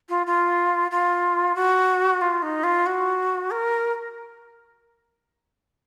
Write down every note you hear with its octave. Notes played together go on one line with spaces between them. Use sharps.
F4
F4
F4
F#4
F4
D#4
F4
F#4
A#4